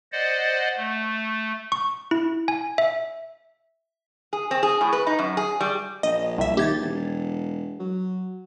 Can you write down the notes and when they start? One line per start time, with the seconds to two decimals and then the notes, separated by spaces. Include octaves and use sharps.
0.12 C5 D5 D#5 F#5
0.77 A3
1.72 C#6
2.11 E4
2.48 G#5
2.78 E5
4.33 G#4
4.51 C4
4.63 G#4
4.81 A2
4.93 B4
5.07 D#4
5.19 F#2
5.37 G#4
5.61 G3
6.03 A#1 D#5
6.38 C2 E5
6.57 D#2 G4 G#6 A6
6.81 E1
7.80 F#3